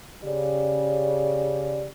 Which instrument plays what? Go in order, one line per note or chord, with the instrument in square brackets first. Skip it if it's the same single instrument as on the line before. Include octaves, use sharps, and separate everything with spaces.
[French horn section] C#3 G4 D5